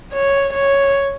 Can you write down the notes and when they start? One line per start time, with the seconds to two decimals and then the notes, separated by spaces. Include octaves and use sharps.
0.14 C#5
0.54 C#5